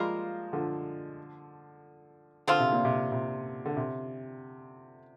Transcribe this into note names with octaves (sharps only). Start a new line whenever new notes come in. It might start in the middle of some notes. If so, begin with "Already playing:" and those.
Already playing: F3 G3 G#3 A#3 F4 A#4
D3 F3
D3 F3 C4 F4
C3
A#2
C3
C3
D3
C3